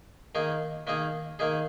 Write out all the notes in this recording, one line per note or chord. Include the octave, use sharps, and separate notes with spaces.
D#3 A#3 D#4 G#4
D#3 A#3 D#4 G#4
D#3 A#3 D#4 G#4